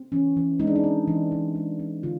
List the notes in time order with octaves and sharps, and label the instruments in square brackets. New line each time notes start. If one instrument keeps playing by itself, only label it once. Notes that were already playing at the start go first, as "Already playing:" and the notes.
Already playing: [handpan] C4
E3 C#4
E3
G#3 D#4
D4
D#4
C4
E3
E3
G#3
C4
D3 F4